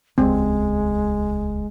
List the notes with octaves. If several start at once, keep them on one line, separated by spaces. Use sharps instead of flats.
D#1 C#2 C#3 G#3 C4